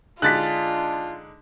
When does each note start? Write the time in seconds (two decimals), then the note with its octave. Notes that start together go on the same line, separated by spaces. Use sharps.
0.22 D3 G#3 D4 D#4 F4 F#6 A6 B6